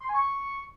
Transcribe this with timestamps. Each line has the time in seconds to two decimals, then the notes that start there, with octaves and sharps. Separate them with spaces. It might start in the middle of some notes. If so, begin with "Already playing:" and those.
0.01 C6
0.08 G#5
0.14 C#6